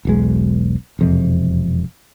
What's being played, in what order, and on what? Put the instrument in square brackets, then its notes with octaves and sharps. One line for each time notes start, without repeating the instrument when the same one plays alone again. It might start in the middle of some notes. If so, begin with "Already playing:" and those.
[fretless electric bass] E1 B1 G#3
E1 F2 C3